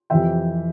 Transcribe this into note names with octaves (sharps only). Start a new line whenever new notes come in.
F2 C3 E3 E5 G5